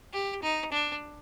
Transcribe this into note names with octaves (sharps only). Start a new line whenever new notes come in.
G4
D#4
D4